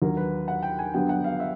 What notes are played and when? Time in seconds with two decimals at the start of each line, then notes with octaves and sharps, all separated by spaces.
0.02 D#2 D3 F#3 A#4
0.17 B4
0.48 F#5
0.63 G5
0.79 G#5
0.94 G2 D3 F#3 B3 G5
1.09 F#5
1.24 F5
1.40 E5